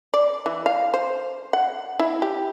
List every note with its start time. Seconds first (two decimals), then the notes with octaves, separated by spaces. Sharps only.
0.14 D5
0.46 E3
0.66 F5
0.94 C5
1.53 F#5
1.99 E4
2.22 G4